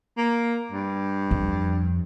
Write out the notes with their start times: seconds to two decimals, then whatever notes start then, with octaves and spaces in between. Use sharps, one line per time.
0.17 A#3
0.72 G2
1.31 F2